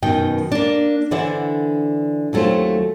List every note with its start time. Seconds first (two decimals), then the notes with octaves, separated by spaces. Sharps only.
0.03 F#2 B2 D#3 B4 G5
0.52 A#3 D4
1.11 D3 E3 D4 E4 C5 F#5
2.33 D#2 F#3 A3 C4 F4 C5